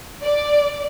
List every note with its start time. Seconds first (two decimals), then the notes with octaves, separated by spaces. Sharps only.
0.24 D5